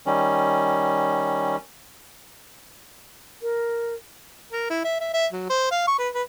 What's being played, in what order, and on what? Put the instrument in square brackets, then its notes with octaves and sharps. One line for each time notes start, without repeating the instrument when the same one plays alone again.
[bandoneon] D#3 G3 C#4
[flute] A#4
[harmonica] A#4
E4
E5
E5
E5
F#3
C5
F5
C#6
B4
B4